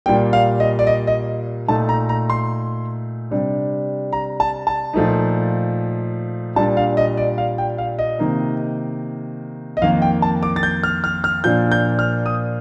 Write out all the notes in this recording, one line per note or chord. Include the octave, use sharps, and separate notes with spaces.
A#2 G3 A#3 G5
F5
D#5
D5
D#5
D#5
A#2 A3 D#4 A5
A#5
A#5
C6
C3 G3 D4
A#5
A5
A5
A#2 F3 A3 D#4
A#2 G3 D4 A5
F5
D#5
D5
F5
G5
F5
D#5
C3 D#3 A#3 D#4
D#5
F2 D#3 A#3 F5
G5
A5
D6
A6
G6
F6
F6
F6
A#2 F3 A#3 D4 G6
G6
F6
D#6